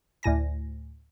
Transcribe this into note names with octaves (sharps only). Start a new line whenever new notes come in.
D2 A2 G#5 A#6